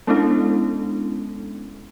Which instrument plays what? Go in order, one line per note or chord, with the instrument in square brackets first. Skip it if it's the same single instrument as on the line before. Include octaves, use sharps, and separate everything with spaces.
[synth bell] G#3 B3 C#4 D4 E4 A4